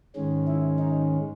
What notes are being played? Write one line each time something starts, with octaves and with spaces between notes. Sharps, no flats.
G#2 D#3 G#3 C#4
E4
D#4